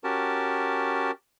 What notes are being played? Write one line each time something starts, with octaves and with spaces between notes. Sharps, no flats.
C#4 F#4 G4 A#4 A5